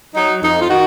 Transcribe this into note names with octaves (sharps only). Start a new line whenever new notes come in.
F#3 D#4
F2 D#4
F4
D#3 D#4 F#4